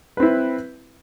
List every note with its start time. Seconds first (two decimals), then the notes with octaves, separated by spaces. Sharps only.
0.17 B4
0.20 C4
0.23 E4